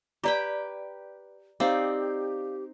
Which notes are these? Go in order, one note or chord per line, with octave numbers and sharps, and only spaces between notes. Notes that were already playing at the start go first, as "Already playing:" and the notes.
G4 B4 D5 G5 A#5 D6
C4 D#4 G4 D5 F5 D6